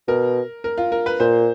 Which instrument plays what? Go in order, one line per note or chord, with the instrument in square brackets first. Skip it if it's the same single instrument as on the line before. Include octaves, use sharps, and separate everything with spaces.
[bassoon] B2 [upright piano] A#4
[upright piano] A#4
F4
A#4
B4
[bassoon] A#2 [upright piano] C5